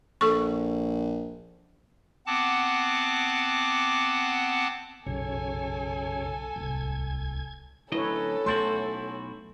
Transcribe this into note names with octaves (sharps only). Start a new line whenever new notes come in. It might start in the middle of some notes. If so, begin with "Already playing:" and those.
A#1 A4 C#6
B3 C4 F#5 A5 D6
B1 F#2 C#3 A4 C#5 G#5
D1 C2 G#6
D2 F#3 C#4 E4 A4 B4 C#5 D#5
B1 A3 E4 F#4 C6 G6 A6